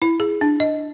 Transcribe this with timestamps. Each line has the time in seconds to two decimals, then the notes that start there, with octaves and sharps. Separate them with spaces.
0.02 E4
0.20 G#4
0.41 D4
0.60 D#5